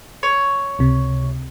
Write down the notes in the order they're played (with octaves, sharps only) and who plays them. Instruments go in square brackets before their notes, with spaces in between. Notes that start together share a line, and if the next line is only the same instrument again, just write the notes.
[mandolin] C#5
[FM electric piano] C#2 C3